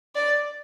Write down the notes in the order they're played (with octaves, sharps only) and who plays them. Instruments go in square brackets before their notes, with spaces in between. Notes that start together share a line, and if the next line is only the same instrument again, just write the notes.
[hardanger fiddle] D5